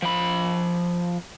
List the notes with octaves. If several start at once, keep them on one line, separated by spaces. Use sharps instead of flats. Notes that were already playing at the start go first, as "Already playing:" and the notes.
F3 B5